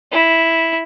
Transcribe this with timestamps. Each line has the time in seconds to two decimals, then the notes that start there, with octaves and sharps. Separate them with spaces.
0.12 E4